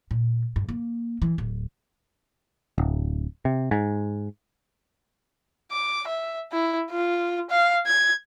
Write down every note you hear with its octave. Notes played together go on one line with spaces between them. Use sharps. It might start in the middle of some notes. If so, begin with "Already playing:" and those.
A#2
G2
A#3
E3
D1
D1
C3
G#2
D6
E5
E4
F4
F5
G#6